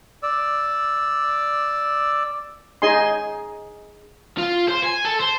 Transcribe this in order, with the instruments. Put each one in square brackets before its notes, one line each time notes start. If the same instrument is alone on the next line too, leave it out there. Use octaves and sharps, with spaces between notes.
[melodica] D5 E6
[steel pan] D#4 G#4 D#5 G#5 C6
[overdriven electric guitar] F4
C5
G#5
A4
C5